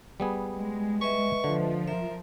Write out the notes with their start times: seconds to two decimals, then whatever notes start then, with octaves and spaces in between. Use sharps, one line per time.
0.20 G3 B3 G#4
0.56 G#3
1.01 B4 D#5 E5 C#6
1.44 D3 F3
1.88 A#4 E5